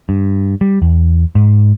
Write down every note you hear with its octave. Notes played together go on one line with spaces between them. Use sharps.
G2
G3
E2
G#2